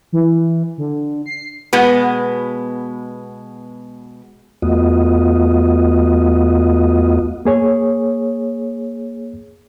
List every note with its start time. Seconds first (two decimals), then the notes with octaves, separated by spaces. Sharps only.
0.13 E3
0.78 D3
1.26 C7
1.73 B2 G#3 B3
4.62 E2 A3 B3 F4 F#4 D#5
7.45 A#3 G#4 C#5